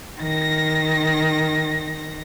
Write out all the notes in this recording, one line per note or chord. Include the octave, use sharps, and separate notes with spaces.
D#3 A#6